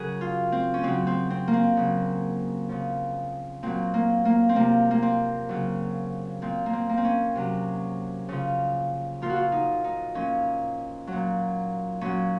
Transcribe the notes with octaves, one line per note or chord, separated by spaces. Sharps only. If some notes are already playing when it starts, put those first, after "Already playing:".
Already playing: C#3 F#3 F#4 G#4 A#4
F4
C4
C#4
C#3 F#3 C4
C4
C4
A#3
C4
C#3 F#3
C#3 F3
A#2 F#3 C4
A#3
A#3
C4
C3 F3 A#3
A#3
C4
C#3 F#3
A#2 F3 C4
A#3
C4
A#3
C4
C#4
C3 F#3
C#3 F3
A#2 F3 F4
F#4
F4
D#4
D#4
A#2 F3 C#4
F#3
A#2
A#2 F#3 C#4